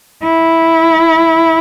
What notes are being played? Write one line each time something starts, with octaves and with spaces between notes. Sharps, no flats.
E4